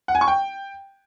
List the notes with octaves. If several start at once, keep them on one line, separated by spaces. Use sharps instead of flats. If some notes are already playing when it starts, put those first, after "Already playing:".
F#5
G#5
C#6
G5